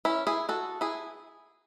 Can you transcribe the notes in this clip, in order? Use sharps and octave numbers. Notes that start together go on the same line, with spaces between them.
C#4 E4
E4 G#4
F#4 A4
E4 G#4